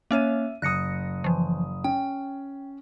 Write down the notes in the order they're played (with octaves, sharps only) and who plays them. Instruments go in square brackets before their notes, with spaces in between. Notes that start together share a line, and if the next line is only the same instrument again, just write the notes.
[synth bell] A#3 C#4 C#5 [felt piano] E5 D#7
[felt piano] F#1 D#6 [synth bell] F#6 A#6 C#7
[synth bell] E3 F3
[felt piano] C#4 [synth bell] G5